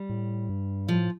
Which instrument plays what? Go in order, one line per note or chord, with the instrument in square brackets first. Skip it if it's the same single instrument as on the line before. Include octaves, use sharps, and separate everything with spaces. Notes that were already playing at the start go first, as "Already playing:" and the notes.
Already playing: [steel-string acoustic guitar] G3
[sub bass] A2
G2
[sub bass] A2 [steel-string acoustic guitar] F3